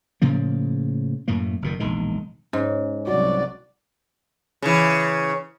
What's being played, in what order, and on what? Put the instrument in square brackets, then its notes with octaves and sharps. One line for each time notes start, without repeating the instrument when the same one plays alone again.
[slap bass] A2 C#3 F3 A#3
F#2 A2 A3 A#3
F#1 A#2 D#3
E1 A#1 D#3 G#3
[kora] G#2 [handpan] C#4
[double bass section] C2 F#3 [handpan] F#4 [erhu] D5
[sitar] C#3 E3